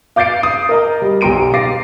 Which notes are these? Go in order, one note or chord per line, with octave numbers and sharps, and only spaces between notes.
F5 D6 G6 A6 C7 D7
D#6
A#4 D#5 A#5
G3
B1 G4 A#5 C6 D7 D#7
F5 D6 A6 A#6 C7